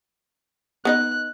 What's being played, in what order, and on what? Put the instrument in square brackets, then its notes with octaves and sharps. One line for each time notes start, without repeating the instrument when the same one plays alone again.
[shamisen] B3 D#4 D#5 [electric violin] F#6